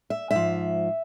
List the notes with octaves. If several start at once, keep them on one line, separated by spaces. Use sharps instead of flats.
E5
G#2 F3 E5